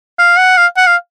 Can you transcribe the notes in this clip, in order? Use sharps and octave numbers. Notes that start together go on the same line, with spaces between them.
F5
F#5
F5
F#5
F5